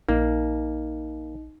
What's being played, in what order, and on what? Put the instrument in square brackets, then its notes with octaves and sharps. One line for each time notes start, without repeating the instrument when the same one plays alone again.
[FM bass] A#1 [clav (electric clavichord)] A#3 [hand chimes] D#4